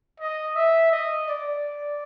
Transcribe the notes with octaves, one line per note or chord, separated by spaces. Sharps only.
D#5
E5
D#5
D5